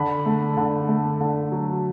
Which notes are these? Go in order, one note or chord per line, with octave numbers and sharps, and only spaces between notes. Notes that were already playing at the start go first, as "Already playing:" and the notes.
Already playing: D3 B5
A3
D3
A3
D3
F#3